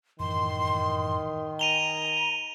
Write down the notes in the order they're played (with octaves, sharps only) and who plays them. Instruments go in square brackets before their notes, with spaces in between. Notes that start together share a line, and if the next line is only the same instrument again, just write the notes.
[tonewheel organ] F#2 A2 E3 [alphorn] D#3 [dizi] C6
[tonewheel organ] G#5 [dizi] A#5 [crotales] D#7 F7 G7